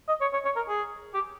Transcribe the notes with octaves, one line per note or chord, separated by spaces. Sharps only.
D#5
C#5
C#5
C#5
A#4
G#4
G4